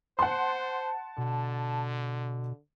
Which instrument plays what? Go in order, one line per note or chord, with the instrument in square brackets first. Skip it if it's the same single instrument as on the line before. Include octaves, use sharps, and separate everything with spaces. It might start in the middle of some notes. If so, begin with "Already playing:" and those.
[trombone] C5 [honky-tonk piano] F#5 C6 [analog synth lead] A5
[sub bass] B2 [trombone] D3